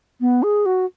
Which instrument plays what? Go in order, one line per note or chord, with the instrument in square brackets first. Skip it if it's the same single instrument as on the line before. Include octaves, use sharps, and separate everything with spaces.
[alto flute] B3
G#4
F#4